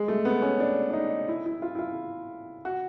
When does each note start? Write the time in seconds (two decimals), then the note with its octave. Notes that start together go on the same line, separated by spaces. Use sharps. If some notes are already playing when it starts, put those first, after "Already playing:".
Already playing: G#3
0.08 A3
0.25 B3
0.42 C#4
0.60 D4
0.90 D4
0.93 D#4
1.28 E4
1.46 E4
1.62 F4
1.75 E4
1.79 F4
2.65 F#4